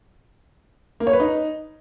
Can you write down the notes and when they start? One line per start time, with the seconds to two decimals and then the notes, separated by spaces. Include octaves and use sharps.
1.00 A#3
1.07 C#5
1.13 B4
1.20 D#4